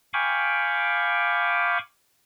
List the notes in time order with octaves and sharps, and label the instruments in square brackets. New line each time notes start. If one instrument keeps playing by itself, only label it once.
[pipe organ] F5 G5 G#5 B5 C#6 D6